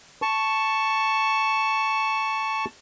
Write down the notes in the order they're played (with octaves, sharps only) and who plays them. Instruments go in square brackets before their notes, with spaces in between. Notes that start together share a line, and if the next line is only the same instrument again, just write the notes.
[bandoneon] A5 C#6